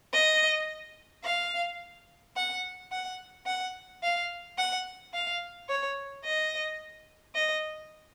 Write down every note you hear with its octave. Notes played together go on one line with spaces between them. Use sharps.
D#5
F5
F#5
F#5
F#5
F5
F#5
F5
C#5
D#5
D#5